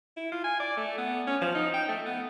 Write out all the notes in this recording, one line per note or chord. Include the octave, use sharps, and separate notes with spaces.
E4
F4
G#5
D5
A3
B3
C#4
F3
D#4
G5
A3
B3